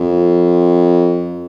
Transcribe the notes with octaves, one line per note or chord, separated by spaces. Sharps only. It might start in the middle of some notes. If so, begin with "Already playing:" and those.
Already playing: F2